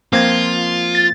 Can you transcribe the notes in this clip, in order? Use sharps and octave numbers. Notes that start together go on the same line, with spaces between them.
F3 A#3 C4 F4 G#6
A6